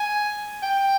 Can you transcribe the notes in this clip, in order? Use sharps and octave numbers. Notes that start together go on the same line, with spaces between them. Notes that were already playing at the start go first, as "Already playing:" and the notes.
Already playing: G#5
G5